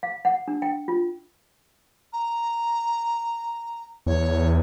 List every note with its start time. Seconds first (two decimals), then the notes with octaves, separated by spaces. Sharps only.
0.03 F5
0.25 F#5
0.48 D4
0.62 G5
0.88 F4
2.12 A#5
4.06 E2 C#5